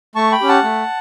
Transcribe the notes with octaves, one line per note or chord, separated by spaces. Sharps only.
A3 A5 C#6
G5 B5
C#4 G4
F#5 A5
A3